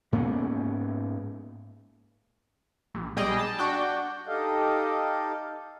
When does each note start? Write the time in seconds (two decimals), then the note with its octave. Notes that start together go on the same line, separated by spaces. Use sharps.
0.12 G#2 A#3 B3 C#4
2.94 A#1
3.16 B1 G3 G#4 D#5 G5
3.39 A5
3.58 D4 F#4 G5
4.27 D#4 G4 A4 D#5 F5